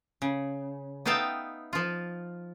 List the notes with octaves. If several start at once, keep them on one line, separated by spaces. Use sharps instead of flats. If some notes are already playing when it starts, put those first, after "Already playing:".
C#3
B3 D#4 E5 F5 G5 A5
F3 F4